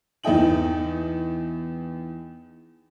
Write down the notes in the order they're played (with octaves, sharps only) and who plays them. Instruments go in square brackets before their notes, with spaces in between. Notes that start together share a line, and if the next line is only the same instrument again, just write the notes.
[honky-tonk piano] E2 D#4 D#5 G5 F#7